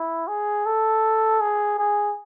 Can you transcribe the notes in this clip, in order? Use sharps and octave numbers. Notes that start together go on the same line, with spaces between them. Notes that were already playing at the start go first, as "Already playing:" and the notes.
Already playing: E4
G#4
A4
G#4
G#4